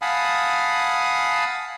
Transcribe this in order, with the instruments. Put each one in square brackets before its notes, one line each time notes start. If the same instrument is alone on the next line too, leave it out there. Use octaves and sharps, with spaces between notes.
[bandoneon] F5 F#5 G#5 A5 B5 D#6